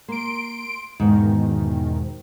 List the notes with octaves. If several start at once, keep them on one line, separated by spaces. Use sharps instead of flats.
A#3 C6 D7
E2 G#2 B2 D#3